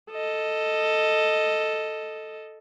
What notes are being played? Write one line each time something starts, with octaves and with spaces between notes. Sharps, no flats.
A4 D#5